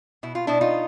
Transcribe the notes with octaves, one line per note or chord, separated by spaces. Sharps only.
B2 E4
F4
B2 D4 E4
D#4 F4